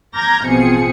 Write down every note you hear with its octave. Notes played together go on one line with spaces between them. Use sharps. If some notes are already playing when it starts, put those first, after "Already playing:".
A#5 D6 F6 G6 G#6 A#6
A1 B2 F3 C4 G#4 C#7